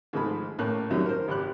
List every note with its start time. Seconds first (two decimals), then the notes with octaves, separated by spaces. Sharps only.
0.13 G#2 D#3 F3 G#3 A3 B5
0.59 A2 A#3 C#4 F#6
0.91 F#2 D#3 F#3 G3 C#4
1.06 A#4 C5
1.28 G#1 G4 F#6